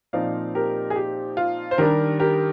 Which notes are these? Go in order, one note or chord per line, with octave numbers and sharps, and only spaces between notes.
A#2 F3 C4 D#4 D5 F5
G4 A#4
G#4
G4
F4
C5
D#3 G3 D4 G4 A#4
G4 A#4